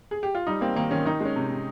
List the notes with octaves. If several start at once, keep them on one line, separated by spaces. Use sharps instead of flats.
G#4
G4
F4
G3 D#4
A#3 C4
D#3 A#3
D#3 C#4
D#3 D#4
G#3 C#4
C3
C3